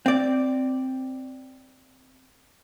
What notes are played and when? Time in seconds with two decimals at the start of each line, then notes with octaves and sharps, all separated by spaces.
0.06 C4 D5